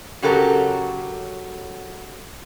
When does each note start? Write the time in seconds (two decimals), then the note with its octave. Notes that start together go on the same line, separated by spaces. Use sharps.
0.22 C#3 F#3 C#4 G4 A4 A#4